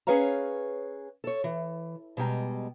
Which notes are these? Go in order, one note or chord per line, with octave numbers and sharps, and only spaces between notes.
C#4 G#4 B4 C#5 F5 A#5
A4 C#5
E3
B2 G3 G#3 G5 A#5